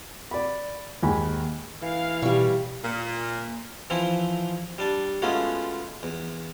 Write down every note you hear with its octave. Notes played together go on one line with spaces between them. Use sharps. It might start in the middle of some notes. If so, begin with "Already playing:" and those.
D5 B5
D#2 G#2 G#5 B5
E3 F5
B2 G3 C#6
A#2
E3 F3 C4 E4
G3 D4 A5
G#3 A3 B3 C#4 F4 F#4
E2